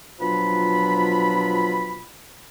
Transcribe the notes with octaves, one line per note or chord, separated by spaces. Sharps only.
B2 F3 F#3 D4 F4 B5